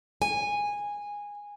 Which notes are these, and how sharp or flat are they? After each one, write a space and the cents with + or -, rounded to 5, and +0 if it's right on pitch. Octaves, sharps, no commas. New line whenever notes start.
G#5 -15